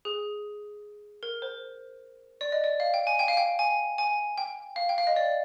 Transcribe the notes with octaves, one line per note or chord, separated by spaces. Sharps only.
G#4
A#4
C5
D5
D#5
D5
F5
G5
G#5
G5
F5
G5
G#5
G#5
G5
F5
G5
F5
D#5
D5